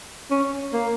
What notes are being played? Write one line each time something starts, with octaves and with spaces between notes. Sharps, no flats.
C#4
A#3